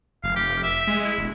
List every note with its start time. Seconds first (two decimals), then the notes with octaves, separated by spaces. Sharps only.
0.24 F1 F5
0.36 G4
0.63 E5
0.87 G#3
1.05 E4
1.18 E1